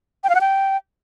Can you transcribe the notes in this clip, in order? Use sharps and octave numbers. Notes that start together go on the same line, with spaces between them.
G5
F5
F#5
G5